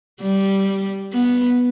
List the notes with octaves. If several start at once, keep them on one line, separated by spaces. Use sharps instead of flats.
G3
B3